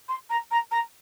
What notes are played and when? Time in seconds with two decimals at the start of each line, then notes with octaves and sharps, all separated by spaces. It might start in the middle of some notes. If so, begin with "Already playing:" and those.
0.08 C6
0.29 A#5
0.51 A#5
0.71 A#5